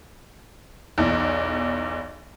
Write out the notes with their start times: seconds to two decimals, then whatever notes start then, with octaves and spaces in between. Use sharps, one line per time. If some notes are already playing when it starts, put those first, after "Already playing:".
0.98 B1 E2